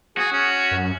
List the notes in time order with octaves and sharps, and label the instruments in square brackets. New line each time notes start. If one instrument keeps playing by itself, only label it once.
[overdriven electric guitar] F#4 [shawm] G#4
[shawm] C#4
[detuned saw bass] F#2